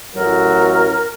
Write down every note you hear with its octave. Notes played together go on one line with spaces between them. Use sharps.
A1 F#3 A#4